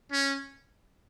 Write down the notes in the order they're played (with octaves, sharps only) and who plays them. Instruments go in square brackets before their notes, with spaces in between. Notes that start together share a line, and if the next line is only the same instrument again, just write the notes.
[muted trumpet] C#4